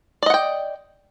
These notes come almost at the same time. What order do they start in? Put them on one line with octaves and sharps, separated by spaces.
D5 D#5 F#5 G5